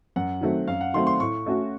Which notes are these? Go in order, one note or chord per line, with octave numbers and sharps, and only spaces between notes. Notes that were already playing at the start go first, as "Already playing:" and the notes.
F#2 F#5
D#3 F#3 A3 C4
F#2 F5
F#5
D#3 F#3 A3 C4 C6
C6
A2 C#6
A3 C#4 F#4